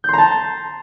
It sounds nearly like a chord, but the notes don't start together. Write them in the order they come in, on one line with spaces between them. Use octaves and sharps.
G6 C6 A#5 A5